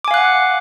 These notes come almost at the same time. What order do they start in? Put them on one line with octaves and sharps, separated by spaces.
D6 G#5 F5 F#6 F#5